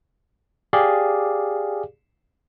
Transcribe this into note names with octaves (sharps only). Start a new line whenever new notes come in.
G4 G#4 D5 F5